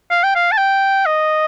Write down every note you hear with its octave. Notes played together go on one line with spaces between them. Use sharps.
F5
G5
F5
A5
G5
D#5